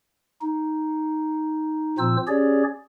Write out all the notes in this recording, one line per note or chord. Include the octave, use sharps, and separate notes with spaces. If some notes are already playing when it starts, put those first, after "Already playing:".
D#4
A#2 F3 C4 F4 C5 E6
C#4 G4 G#4 C#5 D5